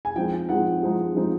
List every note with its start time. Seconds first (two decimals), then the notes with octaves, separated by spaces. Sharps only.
0.05 G#5
0.16 F3 G#3 C4 D#4 G5
0.49 F3 G#3 C4 D#4 F#5
0.83 F3 G#3 C4 D#4
1.15 F3 G#3 C4 D#4